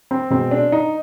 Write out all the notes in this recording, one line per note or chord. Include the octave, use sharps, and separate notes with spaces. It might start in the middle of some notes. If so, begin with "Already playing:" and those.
C4
B2 G#3 C4
D4
D#4